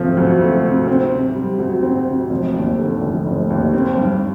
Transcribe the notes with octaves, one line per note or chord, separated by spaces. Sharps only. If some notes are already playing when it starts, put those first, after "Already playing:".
Already playing: C3 F3 A3
D2
A3
C3
C4
C3
G3
D2
C4
C3
F1
D#2
D3
F1
F1
D#2
C4
G2